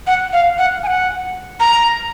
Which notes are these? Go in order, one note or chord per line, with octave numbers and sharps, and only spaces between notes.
F#5
F5
F#5
G#5
F#5
A#5